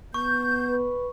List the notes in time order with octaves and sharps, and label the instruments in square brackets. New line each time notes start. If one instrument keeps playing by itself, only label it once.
[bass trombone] B3 [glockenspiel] C#6 [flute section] G6
[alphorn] B4